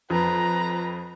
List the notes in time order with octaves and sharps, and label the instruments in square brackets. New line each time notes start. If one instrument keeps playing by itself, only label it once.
[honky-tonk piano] F2 [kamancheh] B4 A#5